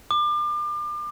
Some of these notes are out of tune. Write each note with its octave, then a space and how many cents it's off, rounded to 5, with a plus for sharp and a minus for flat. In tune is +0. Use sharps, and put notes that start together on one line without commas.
D6 +35